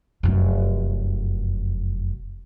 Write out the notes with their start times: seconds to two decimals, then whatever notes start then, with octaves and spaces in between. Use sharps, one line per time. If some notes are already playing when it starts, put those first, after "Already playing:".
0.23 F1 F#2